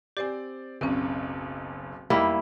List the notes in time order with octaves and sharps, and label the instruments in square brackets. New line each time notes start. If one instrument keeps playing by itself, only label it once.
[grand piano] C4 D5 [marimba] G4 C5 G#5
[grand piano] F#1 B1 [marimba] C4 C#4
[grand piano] E1 D#4 E6 [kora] G3 A#3 E4